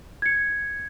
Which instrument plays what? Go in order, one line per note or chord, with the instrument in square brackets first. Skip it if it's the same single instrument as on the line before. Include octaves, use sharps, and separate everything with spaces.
[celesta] G#6 C#7